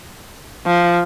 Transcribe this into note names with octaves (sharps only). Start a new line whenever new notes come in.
F3